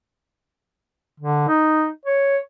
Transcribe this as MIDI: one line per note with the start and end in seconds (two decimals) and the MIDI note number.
1.20 1.48 50
1.48 1.89 63
2.06 2.37 73